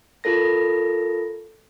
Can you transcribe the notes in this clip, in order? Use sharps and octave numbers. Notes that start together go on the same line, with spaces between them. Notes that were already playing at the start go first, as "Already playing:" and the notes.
F4 A4 A#4 A#6